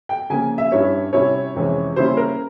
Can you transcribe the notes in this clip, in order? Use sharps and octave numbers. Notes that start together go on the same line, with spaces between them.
G5
C#3 F3 A#3 G#5
E5
G2 G3 C#4 E4 C#5
C3 G3 C#4 E4 C#5
F2 C3 E3 G#3 C#4
C#3 G3 A#3 C#4 E4 C5
A#4